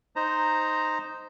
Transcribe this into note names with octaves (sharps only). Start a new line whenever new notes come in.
D#4 C5 A#5